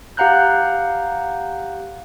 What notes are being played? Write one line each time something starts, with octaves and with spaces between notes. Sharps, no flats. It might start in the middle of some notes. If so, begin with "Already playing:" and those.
G4 F5 F#5 A#5 F#6 G6